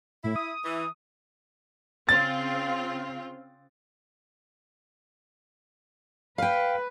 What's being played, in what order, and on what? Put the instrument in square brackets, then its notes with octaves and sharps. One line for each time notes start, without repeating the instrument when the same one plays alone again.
[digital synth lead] A2 [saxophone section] E4
[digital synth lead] D#6
[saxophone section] E3
[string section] C#3 C4 F4 [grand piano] A6
[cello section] B4 [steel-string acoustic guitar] F5 G5